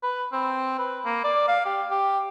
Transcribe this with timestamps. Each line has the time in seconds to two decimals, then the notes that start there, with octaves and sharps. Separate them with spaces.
0.03 B4
0.33 C4
0.79 B4
1.05 A#3
1.24 D5
1.48 F5
1.65 G4
1.91 G4